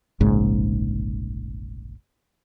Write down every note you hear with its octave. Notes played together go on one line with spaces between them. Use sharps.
F1 A#1 G#2 C#3